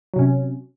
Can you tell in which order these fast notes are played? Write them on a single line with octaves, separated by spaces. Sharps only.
F#3 C3 C#4